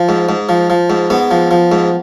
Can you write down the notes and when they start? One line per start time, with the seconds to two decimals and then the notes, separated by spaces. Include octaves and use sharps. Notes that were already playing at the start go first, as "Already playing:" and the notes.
Already playing: F3
0.09 G#2
0.29 G#2
0.49 F3
0.70 F3
0.90 G#2
1.10 G#2 B3
1.31 F3
1.51 F3
1.72 G#2